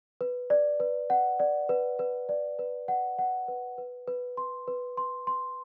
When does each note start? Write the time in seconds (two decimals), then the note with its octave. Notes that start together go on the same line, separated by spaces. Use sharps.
0.21 B4
0.50 D5
0.80 B4
1.10 F#5
1.40 D5
1.69 B4
1.99 B4
2.29 D5
2.59 B4
2.88 F#5
3.18 F#5
3.48 B4
3.78 B4
4.08 B4
4.37 C6
4.68 B4
4.97 C6
5.27 C6